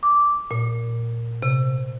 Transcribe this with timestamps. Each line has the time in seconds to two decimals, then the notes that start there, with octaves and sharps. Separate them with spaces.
0.03 D6
0.51 A#2
1.42 C3